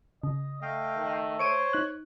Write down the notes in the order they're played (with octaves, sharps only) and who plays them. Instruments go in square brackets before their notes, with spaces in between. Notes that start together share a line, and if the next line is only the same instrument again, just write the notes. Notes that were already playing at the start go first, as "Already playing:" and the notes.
[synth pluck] C#3 [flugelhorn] D#5
[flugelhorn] A3 [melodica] D#5 F5 G5
[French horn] D#3
[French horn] C5 [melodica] C#5 [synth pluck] C#6 D7 D#7
[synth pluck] D#4 F#6